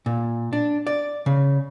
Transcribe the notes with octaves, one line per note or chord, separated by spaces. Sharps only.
A#2
D4
D5
C#3